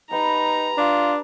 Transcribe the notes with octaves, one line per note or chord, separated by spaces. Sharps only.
D#4 G4 B4 G5 A#5
D4 F4